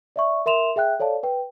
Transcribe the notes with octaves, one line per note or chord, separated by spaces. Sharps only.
D5 E5 C#6
A#4 E5 C6 E7 F7
G#4 E5 G5 F#6
A4 C#5 D5 F5 A5
B4 G5